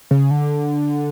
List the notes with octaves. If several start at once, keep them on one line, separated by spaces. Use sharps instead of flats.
C#3
D3